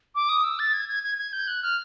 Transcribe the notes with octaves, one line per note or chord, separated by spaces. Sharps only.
D6
D#6
E6
A6
G#6
G#6
G#6
G#6
G6
F#6
F6